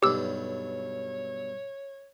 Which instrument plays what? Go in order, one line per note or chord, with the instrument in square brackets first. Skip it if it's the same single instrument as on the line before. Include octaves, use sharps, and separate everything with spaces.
[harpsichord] B1 G2 F#3 [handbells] G4 E6 [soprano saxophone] C#5